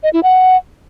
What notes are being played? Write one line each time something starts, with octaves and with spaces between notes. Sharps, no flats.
D#5
E4
F#5